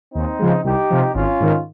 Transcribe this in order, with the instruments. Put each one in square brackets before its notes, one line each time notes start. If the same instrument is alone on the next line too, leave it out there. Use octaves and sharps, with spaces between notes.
[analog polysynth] D#2 [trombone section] C4 D#4
[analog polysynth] C#3 F3 G#3
[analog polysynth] C2 [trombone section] D#4 G4
[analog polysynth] C3 F3
[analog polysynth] G#1 [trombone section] C#4 F4
[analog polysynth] G#2 D#3